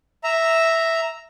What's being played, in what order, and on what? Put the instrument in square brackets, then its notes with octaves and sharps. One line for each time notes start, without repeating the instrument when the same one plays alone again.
[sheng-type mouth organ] E5 A#5